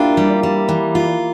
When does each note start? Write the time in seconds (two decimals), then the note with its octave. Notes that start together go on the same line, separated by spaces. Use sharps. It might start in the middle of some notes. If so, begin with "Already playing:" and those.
Already playing: A#3 D4 E4 F4 G4
0.17 G3
0.43 G3
0.69 E3
0.95 F4